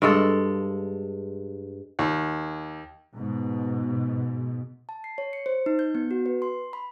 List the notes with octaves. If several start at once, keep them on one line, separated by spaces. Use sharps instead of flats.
G2 G#3 A4
D#2
G#2 B2
A5
C7
C#5
C#7
C5
D#4
G6
B3
F#4
B4
C6
B5